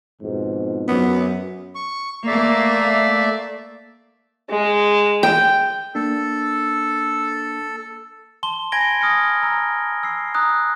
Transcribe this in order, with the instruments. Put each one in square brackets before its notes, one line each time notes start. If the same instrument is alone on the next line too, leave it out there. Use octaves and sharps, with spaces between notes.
[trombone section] F2 G#2 B2
[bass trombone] F#2 [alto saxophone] B3
[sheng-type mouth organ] C#6
[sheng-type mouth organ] A3 D5 E5 [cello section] A#3
[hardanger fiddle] G#3
[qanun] G5
[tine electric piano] A#3 D4 [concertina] A4
[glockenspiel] A5 C6 G7
G#5 B5 G#6 A#6 D7 G7
D#6 F6 A#6 C#7
A#5 E6
E6 C7
A#5 D#6 F#6